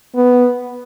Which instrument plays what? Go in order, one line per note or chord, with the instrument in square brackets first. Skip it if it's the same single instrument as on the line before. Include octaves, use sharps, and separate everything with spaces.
[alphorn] B3